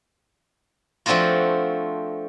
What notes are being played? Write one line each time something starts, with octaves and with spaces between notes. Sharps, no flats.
F3 A3 C4 D4 F4 F#4